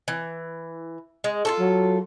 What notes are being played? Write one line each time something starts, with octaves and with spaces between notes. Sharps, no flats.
E3
G#3
F4 F#4 A4
F#3